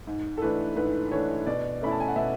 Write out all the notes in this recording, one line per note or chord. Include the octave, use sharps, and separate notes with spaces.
G#2
A4
E3 A3 D4 B4
G#2 B4
E3 A3 D4 C#5
B2 D5
A3 C#4 E4 B5
A5
G#5
F#5
B2 E5